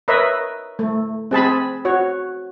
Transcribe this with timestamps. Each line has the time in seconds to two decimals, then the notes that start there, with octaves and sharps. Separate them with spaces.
0.08 A#4 B4 C#5 D#5 E5
0.79 A3
1.31 C4 G#4 A5 B5
1.85 F#4 C#5